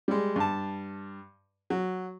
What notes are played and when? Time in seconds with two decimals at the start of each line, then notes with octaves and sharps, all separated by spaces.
0.08 G3 G#3
0.36 G2 A5
1.70 F#3